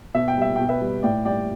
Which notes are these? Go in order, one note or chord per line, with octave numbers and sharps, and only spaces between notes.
B2 E5
G5
G3 E5
B2 G5
B4 E5
G3
A2 D5 G5
G3 D5 G5